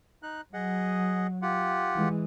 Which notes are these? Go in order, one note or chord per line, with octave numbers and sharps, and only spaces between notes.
D#4 F#6
F#3 G#4 D#5 F#5
F4 G4 F#5
E3 G#3